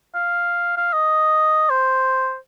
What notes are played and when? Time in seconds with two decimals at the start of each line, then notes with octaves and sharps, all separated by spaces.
0.15 F5
0.77 F5
0.93 D#5
1.70 C5